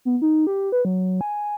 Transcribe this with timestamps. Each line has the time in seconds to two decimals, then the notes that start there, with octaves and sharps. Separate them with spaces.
0.05 B3
0.22 D#4
0.47 G4
0.72 B4
0.85 F#3
1.21 G#5